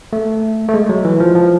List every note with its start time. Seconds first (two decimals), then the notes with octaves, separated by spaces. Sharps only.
0.13 A3
0.68 A3
0.74 G#3
0.89 F#3
1.04 E3
1.20 F3
1.35 F3